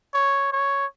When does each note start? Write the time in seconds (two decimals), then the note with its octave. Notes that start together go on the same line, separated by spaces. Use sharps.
0.14 C#5
0.52 C#5